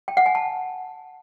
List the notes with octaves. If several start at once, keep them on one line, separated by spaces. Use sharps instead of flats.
G5
F#5
G#5
A5